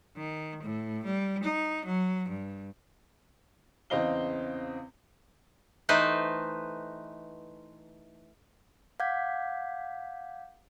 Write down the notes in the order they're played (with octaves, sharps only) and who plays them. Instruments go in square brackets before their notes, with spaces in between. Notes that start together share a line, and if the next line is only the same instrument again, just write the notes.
[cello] D#3
A2
G3
D#4
F#3
G2
[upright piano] E2 C#3 C4 D#5 F5 G7
[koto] E3 A3 D#4 B4 C5
[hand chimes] F5 F#5 D6 G6 G#6 B6